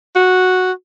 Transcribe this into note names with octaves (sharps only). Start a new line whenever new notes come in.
F#4